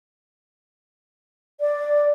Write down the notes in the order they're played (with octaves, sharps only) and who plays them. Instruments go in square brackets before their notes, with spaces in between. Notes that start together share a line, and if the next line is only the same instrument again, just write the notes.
[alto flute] D5